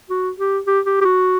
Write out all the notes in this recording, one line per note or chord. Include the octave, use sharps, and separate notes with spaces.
F#4
G4
G4
G4
G4
F#4